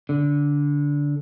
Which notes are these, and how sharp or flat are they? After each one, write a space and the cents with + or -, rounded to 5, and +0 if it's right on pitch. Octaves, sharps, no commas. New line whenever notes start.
D3 -15